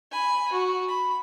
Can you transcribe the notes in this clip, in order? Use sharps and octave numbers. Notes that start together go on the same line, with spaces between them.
G#5 B5
F#4
B5